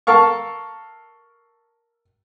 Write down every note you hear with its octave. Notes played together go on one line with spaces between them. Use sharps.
A4 A#4 F5 C#6